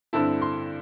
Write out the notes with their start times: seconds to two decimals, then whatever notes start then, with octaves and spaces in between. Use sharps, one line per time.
0.13 G2 D3 C4 E4 A5
0.42 C6